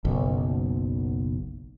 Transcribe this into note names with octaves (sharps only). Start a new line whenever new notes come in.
F#1 B1